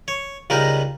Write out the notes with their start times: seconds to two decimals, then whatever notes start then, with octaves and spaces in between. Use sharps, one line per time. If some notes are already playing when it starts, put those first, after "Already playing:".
0.08 C#5
0.50 C#2 G3 D#4 A#4